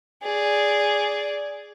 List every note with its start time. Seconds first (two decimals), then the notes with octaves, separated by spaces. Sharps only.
0.23 G#4 D5